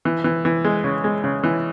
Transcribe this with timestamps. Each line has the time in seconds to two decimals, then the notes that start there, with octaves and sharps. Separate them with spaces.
0.05 E3
0.24 E3
0.45 E3
0.64 G#3
0.84 C#3
1.04 G#3
1.24 C#3
1.43 E3